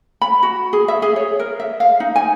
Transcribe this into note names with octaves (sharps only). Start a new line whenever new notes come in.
B5
F#4
G#4
E5
G#4
C#5
A#4
E5
F5
D#4
G#5